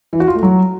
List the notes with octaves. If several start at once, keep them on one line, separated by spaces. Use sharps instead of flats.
E3
F#4
F4
A3
F#3